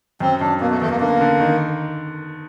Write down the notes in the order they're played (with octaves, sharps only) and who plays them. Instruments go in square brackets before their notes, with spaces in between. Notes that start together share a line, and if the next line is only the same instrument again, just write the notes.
[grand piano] F#2 [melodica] C4
[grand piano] F#2 [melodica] D4
[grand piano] B2 [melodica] A#3
[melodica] A3
[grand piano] E2 [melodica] A3
[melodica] A#3
[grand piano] D3 [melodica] A#3
[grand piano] D3
D#3